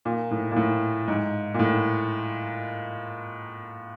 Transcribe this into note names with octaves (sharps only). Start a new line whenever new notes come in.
A#2
A2
A#2
A2
G#2
A#2
A2